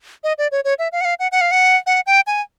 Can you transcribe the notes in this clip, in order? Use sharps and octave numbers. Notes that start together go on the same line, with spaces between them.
D#5
D5
C#5
C#5
E5
F5
F#5
F5
F#5
F#5
F5
F#5
F#5
G5
G#5